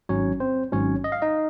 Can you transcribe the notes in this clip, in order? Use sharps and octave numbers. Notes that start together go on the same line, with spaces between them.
G#1 G#2 F#3 C#4 C#5
C4 C5
G#1 G#2 F#3 C#4 C#5
D#5
F5
D#4 D#5